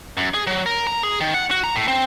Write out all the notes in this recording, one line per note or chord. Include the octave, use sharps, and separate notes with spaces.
F#2
G#4
F#3
A#4
A#5
G#4
D#3
F#5
F#4
A#5
A2
C4